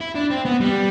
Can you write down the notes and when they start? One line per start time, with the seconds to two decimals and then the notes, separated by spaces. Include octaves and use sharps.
0.01 E4
0.15 D4
0.31 C4
0.45 B3
0.61 G3